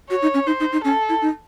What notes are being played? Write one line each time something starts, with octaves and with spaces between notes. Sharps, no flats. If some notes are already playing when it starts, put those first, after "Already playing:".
F#4 C#5
D#4
C#4
D#4 C5
D#4
D#4
C#4 A4
E4
D#4